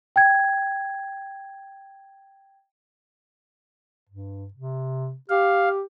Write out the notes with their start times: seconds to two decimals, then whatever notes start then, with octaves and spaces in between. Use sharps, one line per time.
0.16 G5 G#6
4.09 G2
4.54 C3
5.30 G4 F5